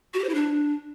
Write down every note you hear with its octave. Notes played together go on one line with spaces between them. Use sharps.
F#4
G4
C5
E4
D4